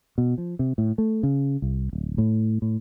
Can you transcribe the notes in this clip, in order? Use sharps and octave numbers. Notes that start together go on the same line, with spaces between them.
B2
F3
C3
A2
A3
C#3
C2
D1
A2
A2